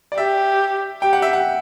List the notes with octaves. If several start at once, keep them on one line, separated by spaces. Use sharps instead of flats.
D5
G4 E5
G4 G5
F#5
E5
F#5